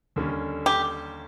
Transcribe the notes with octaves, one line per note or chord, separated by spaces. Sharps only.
D#2 D3 G3 A#3 C#4
G4